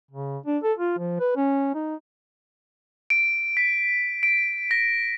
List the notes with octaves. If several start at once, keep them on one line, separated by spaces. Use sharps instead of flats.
C#3
D4
A4
F4
F3
B4
C#4
D#4
D7
B6
D7
A#6